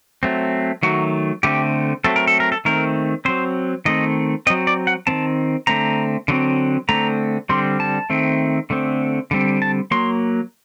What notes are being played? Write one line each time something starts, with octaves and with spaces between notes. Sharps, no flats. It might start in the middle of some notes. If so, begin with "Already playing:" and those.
F#3 A3 C4
D#3 F#3 A3 F#4
D3 A3 C4 G4
F#3 A3 C4 A4
A#4
A4
A#4
A4
D#3 A3 C4 A#4
F#3 C4 C5
D#3 A3 C4 D#5
F#3 C4 D#5
D5
F#5
D#3 A3 C4 A5
D3 A3 C4 A#5
D3 F#3 C4
D3 A3 C4 A#5
D3 G3 C4 C6
A5
D#3 A3 C4
D3 A3 C4
D3 G3 C4
A5
F#3 A#3 C6